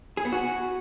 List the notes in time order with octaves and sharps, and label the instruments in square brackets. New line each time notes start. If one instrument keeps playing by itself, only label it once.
[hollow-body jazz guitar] G#4
B3
F#4